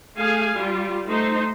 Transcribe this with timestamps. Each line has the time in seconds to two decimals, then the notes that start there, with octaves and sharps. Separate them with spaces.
0.17 A3 G#4 F5 G#5
0.53 G3 F4
1.07 A3 D#4 C5